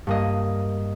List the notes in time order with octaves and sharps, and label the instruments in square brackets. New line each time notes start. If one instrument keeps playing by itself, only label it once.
[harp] G2 A#3 D#5